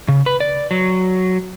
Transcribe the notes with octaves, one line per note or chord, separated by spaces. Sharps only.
C#3
B4
D5
F#3